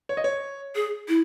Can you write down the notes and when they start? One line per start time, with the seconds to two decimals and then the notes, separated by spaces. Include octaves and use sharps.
0.09 C#5
0.17 D#5
0.24 C#5
0.75 G#4
1.08 E4